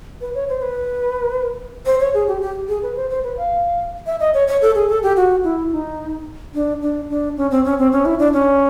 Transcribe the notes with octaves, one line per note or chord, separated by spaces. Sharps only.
B4
C#5
C5
B4
C5
C#5
G#4
G4
G4
G#4
B4
C5
C5
B4
F5
E5
D#5
C#5
C#5
A4
G#4
A4
G4
F#4
E4
D#4
D4
D4
D4
C#4
C4
C#4
C4
C#4
E4
D4
C#4